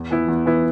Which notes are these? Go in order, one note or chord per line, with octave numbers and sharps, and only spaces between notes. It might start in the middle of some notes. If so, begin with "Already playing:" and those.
Already playing: E2
E3 B3 E4
E2
E3 B3 E4